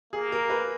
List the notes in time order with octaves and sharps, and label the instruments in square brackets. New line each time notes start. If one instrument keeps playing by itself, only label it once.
[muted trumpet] A#3 [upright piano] G#4
[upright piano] A#4
B4